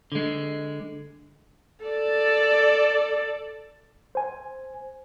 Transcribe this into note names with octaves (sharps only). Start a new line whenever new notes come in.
D3 G#3
A4 D5
C5 G#5